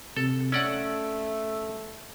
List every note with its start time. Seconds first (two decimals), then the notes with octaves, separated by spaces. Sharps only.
0.17 C3 A4
0.52 A3 C#4 D5 F#5 E6